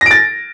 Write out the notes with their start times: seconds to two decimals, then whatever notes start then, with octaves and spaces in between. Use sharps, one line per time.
0.01 A#6
0.06 D7
0.11 A6